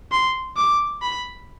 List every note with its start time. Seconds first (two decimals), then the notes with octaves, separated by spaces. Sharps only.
0.12 C6
0.57 D6
1.02 B5